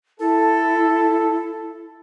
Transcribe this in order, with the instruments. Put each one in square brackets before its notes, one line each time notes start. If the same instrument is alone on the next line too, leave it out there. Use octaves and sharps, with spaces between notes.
[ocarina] E4 [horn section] A4